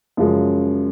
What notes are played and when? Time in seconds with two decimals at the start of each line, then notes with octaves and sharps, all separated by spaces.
0.17 F#2 C#3 F3 G#3